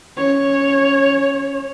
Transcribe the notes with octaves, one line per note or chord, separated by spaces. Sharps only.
C#4 C#5